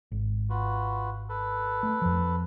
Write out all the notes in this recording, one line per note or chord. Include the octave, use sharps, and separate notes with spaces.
G#1
F4 F#4 B4
A4 B4
A3
F2 F3